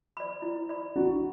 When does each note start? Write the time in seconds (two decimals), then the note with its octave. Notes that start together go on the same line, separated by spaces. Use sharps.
0.17 D5 B5
0.42 E4
0.69 D5 B5
0.96 D4 E4 F#4